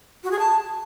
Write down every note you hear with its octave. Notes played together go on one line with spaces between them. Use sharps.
F#4
G#4
A5